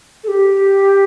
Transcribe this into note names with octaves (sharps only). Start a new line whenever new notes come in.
A4
G4